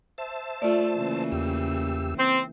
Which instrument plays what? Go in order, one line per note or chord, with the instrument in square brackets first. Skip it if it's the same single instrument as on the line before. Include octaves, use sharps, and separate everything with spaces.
[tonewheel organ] C5 E5 A5
[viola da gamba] A3 [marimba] F4 D5
[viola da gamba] C#3 E3 A#3
[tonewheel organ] E2 G4 E6
[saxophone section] C4